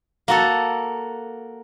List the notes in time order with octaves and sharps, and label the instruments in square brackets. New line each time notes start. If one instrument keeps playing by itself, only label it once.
[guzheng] A#3 F#4 A4